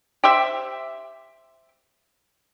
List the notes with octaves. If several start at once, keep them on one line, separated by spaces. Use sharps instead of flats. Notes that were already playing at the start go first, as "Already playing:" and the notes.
G4 C5 E5